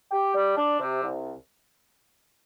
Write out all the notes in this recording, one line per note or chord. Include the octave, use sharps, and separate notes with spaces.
G4
G3
D4
C3
C2